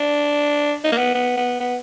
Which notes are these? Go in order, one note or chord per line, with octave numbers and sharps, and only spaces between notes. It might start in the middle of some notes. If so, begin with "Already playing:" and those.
Already playing: D4
D#4
A#3
B3
B3
B3
B3